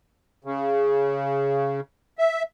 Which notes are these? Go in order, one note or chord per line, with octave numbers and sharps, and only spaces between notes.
C#3
E5